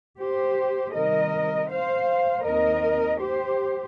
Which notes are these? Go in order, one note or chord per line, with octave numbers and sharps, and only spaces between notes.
G4 C5
C3 D#3 G3 C4 A#4 D#5
C5 F5
D#2 D#3 C4 A#4 D#5
G4 C5